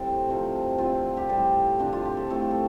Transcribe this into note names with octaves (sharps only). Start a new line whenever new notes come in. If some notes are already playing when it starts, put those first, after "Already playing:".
Already playing: A2 G3 A3 C4 A4 C5
C3 F3 A3
D3 A3 C4 F4
G4
A2 G3 C4 A4
C3 F3 C4 D4
F4
G4
A4
A2 A3 C4 A4
A4